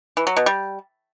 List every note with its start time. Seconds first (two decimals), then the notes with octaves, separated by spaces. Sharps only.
0.17 E3
0.27 F#3
0.37 B2
0.46 G3